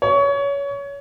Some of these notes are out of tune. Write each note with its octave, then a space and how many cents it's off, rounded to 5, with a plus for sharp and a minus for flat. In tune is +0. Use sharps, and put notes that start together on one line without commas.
C#5 +25